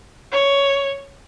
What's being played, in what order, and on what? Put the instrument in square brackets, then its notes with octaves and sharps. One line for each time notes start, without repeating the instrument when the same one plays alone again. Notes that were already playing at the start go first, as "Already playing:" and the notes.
[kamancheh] C#5